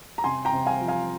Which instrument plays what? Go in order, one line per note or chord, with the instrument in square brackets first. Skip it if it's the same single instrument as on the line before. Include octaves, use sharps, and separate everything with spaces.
[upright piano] A#5
C3 G#5 C6
G5 A#5
C3
F5 G#5
F3
F5 G#5